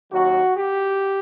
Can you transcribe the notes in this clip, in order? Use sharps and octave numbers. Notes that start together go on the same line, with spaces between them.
D#2 D#3 F#3 F#4
G4